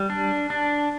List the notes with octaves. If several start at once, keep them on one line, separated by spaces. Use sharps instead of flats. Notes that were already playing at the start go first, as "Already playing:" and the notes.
Already playing: G3
D4
D4